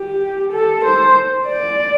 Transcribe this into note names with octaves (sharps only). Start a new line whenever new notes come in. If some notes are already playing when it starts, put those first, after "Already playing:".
Already playing: G4
A4
C5
D5